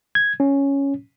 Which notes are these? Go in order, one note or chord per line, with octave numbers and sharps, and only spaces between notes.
G#6
C#4